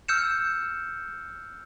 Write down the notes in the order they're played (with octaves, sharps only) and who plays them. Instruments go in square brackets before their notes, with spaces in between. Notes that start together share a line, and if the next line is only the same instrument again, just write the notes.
[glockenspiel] E6 F6 G6 C#7 E7